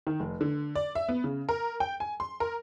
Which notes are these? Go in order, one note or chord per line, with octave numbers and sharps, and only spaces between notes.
D#3
F1
D3
D5
E5
B3
C#3
A#4
G5
G#5
C6
A#4